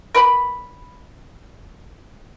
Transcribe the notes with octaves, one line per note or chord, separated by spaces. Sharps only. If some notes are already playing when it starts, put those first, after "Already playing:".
A#4 B4 D5 B5